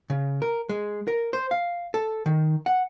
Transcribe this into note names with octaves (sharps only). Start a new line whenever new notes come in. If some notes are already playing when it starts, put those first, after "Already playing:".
C#3
A#4
G#3
A#4
C5
F5
A4
D#3
F#5